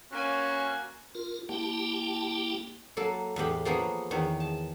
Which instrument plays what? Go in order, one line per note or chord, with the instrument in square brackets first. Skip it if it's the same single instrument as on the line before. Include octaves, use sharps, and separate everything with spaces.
[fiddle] A#3 G#5 [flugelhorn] C#4 [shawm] F#4
[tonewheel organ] F4 A#4
A#3 E4 G4 G5 A5
[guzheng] F#3 A#3 A4
E2 A2 G4 B5
F3 A#3 B3 G#4 C#5
E2 D#3 C#5
A5